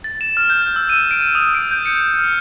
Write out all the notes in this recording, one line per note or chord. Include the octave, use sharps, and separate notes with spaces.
A6
E7
F6
G6
E6
D#7
D7
D#6
D7
G6
C#7
F6